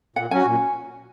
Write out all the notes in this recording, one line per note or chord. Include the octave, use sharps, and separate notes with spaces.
A#2 F#5
F#3 C#4 F#4 G#5
A#2